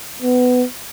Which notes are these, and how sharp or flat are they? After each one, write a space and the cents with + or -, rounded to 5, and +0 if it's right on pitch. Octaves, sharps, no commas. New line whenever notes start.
B3 +20